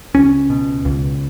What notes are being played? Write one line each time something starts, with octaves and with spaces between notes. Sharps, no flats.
C#2 C#4
B2
C#2